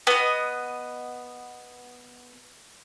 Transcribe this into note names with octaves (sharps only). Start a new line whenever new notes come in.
B3 D#5